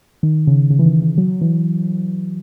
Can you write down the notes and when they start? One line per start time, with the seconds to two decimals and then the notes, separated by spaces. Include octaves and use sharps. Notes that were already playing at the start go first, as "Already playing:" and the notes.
0.23 D#3
0.47 C#3
0.70 C#3
0.79 E3
0.86 D#3
1.02 E3
1.18 F#3
1.41 E3